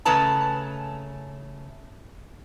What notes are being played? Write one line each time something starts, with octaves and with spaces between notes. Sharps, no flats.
C#3 A3 C#4 B4 A5 A#5